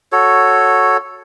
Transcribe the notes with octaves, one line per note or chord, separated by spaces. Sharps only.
F#4 A4 C#5